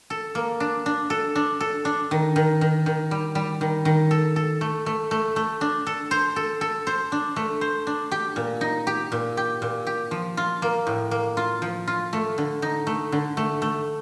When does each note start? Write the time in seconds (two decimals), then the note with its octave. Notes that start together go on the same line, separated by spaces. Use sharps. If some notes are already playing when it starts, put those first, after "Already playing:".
0.10 A4
0.35 A#3
0.60 D4
0.86 D4
1.10 A4
1.36 D4
1.61 A4
1.85 D4
2.11 D#3
2.36 D#3
2.61 D#3
2.86 D#3
3.11 G3
3.35 G3
3.61 D#3
3.85 D#3
4.11 A4
4.36 A4
4.61 A3
4.86 A3
5.11 A3
5.36 A3
5.61 D4
5.87 A4
6.11 C5
6.36 A4
6.61 A4
6.87 C5
7.12 D4
7.36 A3
7.61 C5
7.87 D4
8.12 G4
8.36 A#2
8.61 D#4
8.87 G4
9.12 A#2
9.37 G4
9.62 A#2
9.87 G4
10.11 F3
10.37 F4
10.62 A#3
10.87 A2
11.11 A#3
11.37 F4
11.62 F3
11.87 F4
12.13 A3
12.38 D3
12.62 D#4
12.87 A3
13.12 D3
13.37 A3
13.62 A3